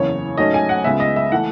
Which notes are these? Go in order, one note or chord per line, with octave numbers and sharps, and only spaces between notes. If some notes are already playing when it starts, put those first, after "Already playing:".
Already playing: F#1 E2 C#3 C#5
G#2 F#3 A3 C#4 D#5
G#5
F#5
C#2 C#3 G#3 B3 E5
D#5
E5
E3 A3 F#5